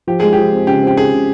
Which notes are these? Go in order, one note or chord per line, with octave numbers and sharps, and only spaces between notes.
F3 G4
G#3 G#4
F3 G4
C4
C#3 G4
C4 G4
C#3 G#4
C#3